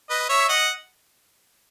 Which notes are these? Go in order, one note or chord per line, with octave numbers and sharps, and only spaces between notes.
B4 D#5
C#5 E5
D#5 F#5